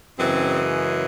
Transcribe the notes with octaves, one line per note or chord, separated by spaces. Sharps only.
F#2 C#3 E3 G#3 C4